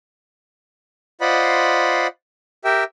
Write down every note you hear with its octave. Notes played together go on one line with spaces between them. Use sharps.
F4 C5 D5 D#5 F#5 B5
G4 A#4 E5 G5